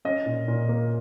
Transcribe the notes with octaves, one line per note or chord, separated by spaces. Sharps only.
C#4 D#5
A#2
A#2
A#3